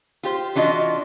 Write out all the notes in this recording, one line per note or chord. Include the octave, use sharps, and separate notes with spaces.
F4 G4 C5
E3 D4 F4 F#4 D#5